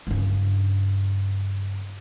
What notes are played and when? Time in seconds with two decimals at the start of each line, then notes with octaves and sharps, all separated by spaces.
0.07 G2 C#3